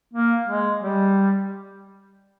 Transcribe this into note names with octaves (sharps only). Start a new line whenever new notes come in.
A#3
G#3
G3